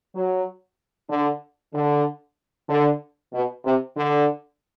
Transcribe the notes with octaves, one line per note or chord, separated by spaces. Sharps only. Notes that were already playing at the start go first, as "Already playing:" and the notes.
F#3
D3
D3
D3
B2
C3
D3